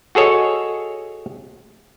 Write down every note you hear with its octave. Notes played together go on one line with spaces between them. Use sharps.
F#4 G#4 A4 C#5 D#5